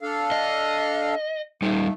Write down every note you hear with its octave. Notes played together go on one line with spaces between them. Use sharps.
D4 A4 F5
D#5
D#3 G3 A3 D#4